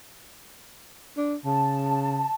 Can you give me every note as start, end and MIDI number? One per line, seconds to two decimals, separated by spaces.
1.17 1.36 62
1.45 2.24 49
1.45 2.34 81